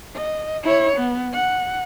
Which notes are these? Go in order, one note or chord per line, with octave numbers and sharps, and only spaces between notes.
D#5
E4 C#5
B3
F#5